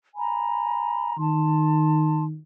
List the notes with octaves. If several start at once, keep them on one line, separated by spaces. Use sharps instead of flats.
G#5 A#5 B5
D#3 A5 C6